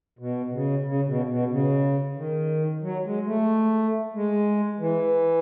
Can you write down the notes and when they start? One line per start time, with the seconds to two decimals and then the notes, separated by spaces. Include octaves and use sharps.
0.19 B2
0.52 C#3
0.85 C#3
1.06 B2
1.29 B2
1.50 C#3
2.17 D#3
2.82 F#3
3.04 G#3
3.26 A3
4.14 G#3
4.80 E3